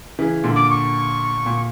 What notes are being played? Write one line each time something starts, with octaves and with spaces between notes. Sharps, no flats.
C#3 E3
A#2 D3
D6
C#6
A#2